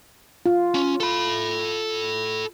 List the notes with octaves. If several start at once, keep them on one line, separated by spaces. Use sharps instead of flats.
F4
C#4
A4 B5